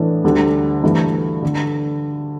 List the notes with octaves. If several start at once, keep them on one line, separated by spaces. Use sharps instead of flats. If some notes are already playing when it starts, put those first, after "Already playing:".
Already playing: A2 E3 B3 D4
D2 D3 G3 D4
G2 E3 A3
D3